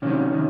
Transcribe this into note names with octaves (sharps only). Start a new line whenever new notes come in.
C3 D#3 F#3 C#4
C3 D#3